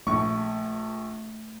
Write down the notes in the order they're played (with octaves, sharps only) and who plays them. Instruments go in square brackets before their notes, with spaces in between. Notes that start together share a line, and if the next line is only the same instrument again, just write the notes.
[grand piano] A#1 C#6 [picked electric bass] A3